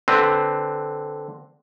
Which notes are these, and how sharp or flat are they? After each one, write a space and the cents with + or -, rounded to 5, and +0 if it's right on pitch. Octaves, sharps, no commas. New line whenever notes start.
D3 -5 C4 +0 B4 +0